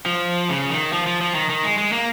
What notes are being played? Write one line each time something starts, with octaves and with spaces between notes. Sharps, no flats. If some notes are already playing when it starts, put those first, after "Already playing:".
F3
C#3
D#3
F3
F3
F3
D#3
D#3
G#3
G#3
A#3